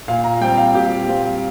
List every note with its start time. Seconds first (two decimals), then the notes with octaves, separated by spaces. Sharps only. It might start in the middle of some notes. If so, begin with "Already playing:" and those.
0.08 A#2 F5
0.24 A#5
0.41 G3 C4 G5
0.57 F5
0.75 A#2 G4
1.08 G3 C4 F4